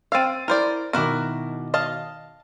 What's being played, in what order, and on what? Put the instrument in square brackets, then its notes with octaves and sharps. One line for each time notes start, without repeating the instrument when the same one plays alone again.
[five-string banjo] C4 F5 [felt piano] E6 A6 D#7
[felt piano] E4 [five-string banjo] A#4 C5 D5
[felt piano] B2 D#3 D6 [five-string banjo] E4 F#4 A#4
[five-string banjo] D#5 F5 A5